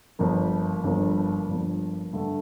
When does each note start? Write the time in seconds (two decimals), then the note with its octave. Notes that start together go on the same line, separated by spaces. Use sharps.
0.19 G1 G2 F3 A#3
0.83 G1 G2 F3 A#3
1.48 G1 G2 F3 A#3
2.13 G2 D3 A3